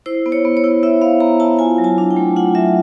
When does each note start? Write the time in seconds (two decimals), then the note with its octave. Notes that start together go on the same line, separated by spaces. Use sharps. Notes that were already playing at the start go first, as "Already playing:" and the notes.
0.06 E4 C5
0.26 B3
0.32 C#5
0.45 B3
0.57 C#5
0.64 E4
0.83 E4 E5
1.01 B3 F5
1.20 B3 A#5
1.40 E4 A5
1.59 F4 G#5
1.78 F#3
1.84 A5
1.98 D4
2.11 G5
2.16 A3
2.36 F4 F#5
2.55 F#3 E5